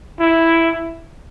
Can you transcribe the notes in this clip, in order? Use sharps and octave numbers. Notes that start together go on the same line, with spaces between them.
E4